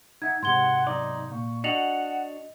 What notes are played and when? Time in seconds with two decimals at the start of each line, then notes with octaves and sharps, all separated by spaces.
0.22 D#4 E5 F#5 G#6
0.43 G#2 C3 F#5 C6 G#6 G7
0.87 B1 D#4 D5
1.32 A#2 C#6
1.64 D4 F#4 D#5 F#5 C#7 F7 F#7